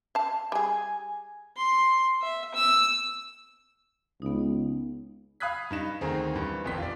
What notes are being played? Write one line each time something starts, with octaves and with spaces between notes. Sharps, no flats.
F5 A5
G3 G#4 G#5
C6
E5
E6
C#2 B3 D#4
F5 B5 D#6 F#6 G#6 B6
G2 D#4 E7
D2 D#3 C4 G#4 A#5
G2 E3
D#1 A#1 F2 B6
F4 D5